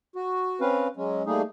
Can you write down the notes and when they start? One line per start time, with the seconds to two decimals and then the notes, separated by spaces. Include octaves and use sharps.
0.16 F#4
0.61 C4 C#4 B4 F5
0.97 F#3 G#3 C#4
1.26 G3 A3 A#3 D#4 G#4